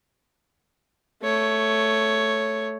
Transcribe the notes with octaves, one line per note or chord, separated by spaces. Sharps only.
A3 C#5